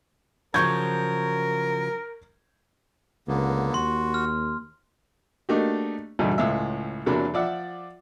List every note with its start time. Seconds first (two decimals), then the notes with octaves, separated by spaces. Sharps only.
0.54 C#3 F3 F#3 A#4 C#6 G6 G#6
3.28 C#2 D3 A#3 B3
3.74 D#2 F#4 C6
4.14 F6
5.49 A3 A#3 D4 D#4 F#4 G4
6.19 E2 G2 B2 D3 D#4
6.38 C#2 A2 G#3 E5
7.06 E2 C3 F#3 A#3 D4 B5
7.34 F3 D5 E5 F#5